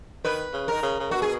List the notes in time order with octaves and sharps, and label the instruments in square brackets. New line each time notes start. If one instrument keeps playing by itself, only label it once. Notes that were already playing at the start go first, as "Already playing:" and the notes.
[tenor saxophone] D#3 [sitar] B4
[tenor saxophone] C#3
[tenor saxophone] D#3 [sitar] A#4
[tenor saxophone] C#3
C#3
[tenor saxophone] B2 [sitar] F#4
[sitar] G#4